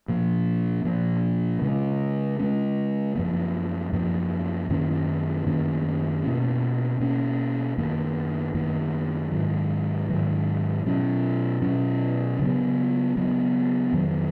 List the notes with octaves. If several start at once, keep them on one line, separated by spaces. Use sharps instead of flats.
A#2 F3 A#3
A#2 F3 A#3
C#3 G#3 C#4
C#3 G#3 C#4
F#2 F3 A#3
F#2 F3 A#3
F#2 D#3 A#3 C#4
F#2 D#3 A#3 C#4
B2 A#3 C#4
B2 A#3 C#4
F#2 D#3 A#3
F#2 D#3 A#3
G#2 D#3 F#3
G#2 D#3 F#3
B2 F#3 C#4
B2 F#3 C#4
C#3 F#3 B3
C#3 F#3 B3
F2 D#3 F#3